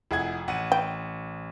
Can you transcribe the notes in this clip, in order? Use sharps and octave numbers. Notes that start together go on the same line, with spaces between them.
F1 E4 G#4 F#5 G#6
A1 F#5 D#7
G5